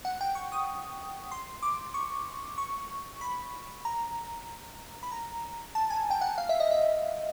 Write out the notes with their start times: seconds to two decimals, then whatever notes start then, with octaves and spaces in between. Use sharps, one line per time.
0.05 F#5
0.21 G5
0.35 C#6
0.52 D#6
1.31 C6
1.62 D6
1.94 C#6
2.58 C#6
3.21 B5
3.85 A#5
5.03 B5
5.12 A#5
5.75 A5
5.90 G#5
6.10 G5
6.21 F#5
6.38 F5
6.49 E5
6.60 D#5
6.71 E5